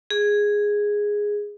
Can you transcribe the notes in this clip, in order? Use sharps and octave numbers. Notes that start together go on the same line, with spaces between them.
G#4